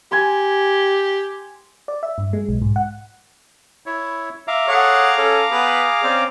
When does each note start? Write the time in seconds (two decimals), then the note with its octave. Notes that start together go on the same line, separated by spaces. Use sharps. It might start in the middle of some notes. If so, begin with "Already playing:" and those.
0.12 G4 G#5 C6
1.88 D5
2.03 E5
2.18 G2
2.33 G#3
2.49 B1
2.62 G#2
2.76 F#5
3.86 E4 C#5
4.48 E5 F5 A#5 D6
4.68 G#4 A4 C#5 F#5
5.18 C#4 A4
5.52 B3 G#4 B4
6.03 C4 C#4 D5